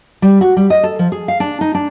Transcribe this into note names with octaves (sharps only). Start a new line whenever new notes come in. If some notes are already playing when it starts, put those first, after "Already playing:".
G3
F#4
G3
D#5
A4
F3
G#4
F5
D4
D#4
D4